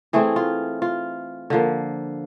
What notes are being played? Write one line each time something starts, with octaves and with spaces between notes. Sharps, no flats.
E3 A3 C4 G#4
F4
F4
D3 F3 A#3